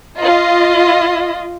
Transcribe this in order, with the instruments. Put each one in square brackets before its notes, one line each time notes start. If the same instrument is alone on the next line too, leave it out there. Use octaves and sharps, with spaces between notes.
[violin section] F4 D#5